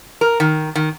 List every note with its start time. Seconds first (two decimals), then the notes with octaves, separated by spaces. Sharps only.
0.21 A#4
0.40 D#3
0.75 D#3